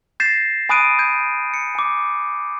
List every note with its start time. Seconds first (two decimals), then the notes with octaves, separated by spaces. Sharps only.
0.20 G6 A6 A#6 C7 E7
0.69 G#5 B5 D#6 F#6 D7 D#7
0.99 G6 G#6 D#7
1.54 C#7
1.75 G#5 D6